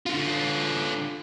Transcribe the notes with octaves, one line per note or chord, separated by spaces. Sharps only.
D3 F4